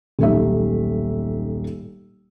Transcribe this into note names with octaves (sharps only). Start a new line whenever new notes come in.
D#1 B1 A3 D#4 E5